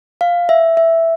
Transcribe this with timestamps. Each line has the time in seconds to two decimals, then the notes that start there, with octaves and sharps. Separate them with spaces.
0.21 F5
0.49 E5
0.77 E5